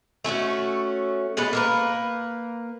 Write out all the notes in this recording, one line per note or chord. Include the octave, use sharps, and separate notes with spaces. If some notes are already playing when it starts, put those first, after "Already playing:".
A3 C#4 F4 F#4
G#3 B3 A4 B4
A#3 A#4 B4